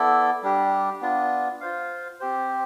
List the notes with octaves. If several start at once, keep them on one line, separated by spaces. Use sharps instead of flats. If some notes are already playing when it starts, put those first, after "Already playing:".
Already playing: B3 E4 A4 D5
G3 D4 G4
B3 D4 F4
F4 C5 F5
C4 G4 C5